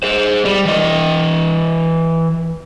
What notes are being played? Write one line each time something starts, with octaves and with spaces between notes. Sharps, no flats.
G#4 C5
G3
E3 D#5